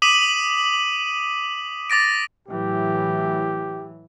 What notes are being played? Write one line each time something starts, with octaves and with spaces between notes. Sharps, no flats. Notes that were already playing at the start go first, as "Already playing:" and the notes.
D6 D#6 B6 D#7 E7 F#7
D6 A6 A#6 D7
A2 E3 F#3 G4